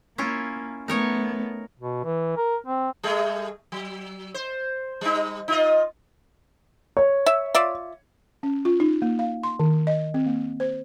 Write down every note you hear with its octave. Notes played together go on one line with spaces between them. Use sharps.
A#3 C#4 E4 F4
A3 B3 D#4 A#4 C#5
B2
E3
A#4
C4
G3 A3 G#4
F#3
C5
G3 D#4
D#4 F4 D#5
C#5
E5
F4 D5 E5
C#4
F4
D#4
A#3
F5
C6
D#3
D#5
C4
A#3
C5